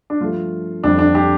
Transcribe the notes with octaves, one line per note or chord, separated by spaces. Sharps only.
D4
G2 F3 A3 F4
F2 D3 G3 D4
D4
D4 G4